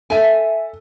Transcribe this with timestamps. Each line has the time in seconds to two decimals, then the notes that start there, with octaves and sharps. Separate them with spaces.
0.10 A4 E5 G#5